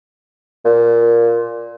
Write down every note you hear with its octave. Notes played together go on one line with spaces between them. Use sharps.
A#2